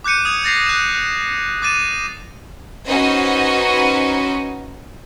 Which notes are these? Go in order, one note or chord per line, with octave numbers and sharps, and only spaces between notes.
D6 F#6 G6 C#7 D#7
D#6 G#6 F7
G6 A6 A#6 C7 F7
F#6 E7
F#6
D6 F#6 A6 D#7 E7
C#4 D#4 F#4 B4 C5 D#5